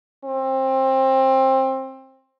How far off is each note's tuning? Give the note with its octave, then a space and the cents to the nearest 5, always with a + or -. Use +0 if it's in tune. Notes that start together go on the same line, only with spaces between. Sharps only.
C4 +20